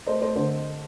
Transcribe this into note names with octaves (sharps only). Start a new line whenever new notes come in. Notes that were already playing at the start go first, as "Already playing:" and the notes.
A3 C5 D#5
A3 C5
D3 C5